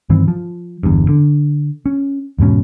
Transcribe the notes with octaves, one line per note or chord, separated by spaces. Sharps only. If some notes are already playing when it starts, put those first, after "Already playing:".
G2 D#3 E3 C4
F3
G1 E2 G2
D3
C#4
E2 G#2 B2 C#4